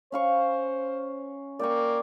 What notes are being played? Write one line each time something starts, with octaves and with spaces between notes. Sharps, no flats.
C#4 C5 F5 C#6
A#3 D5 G5 C#6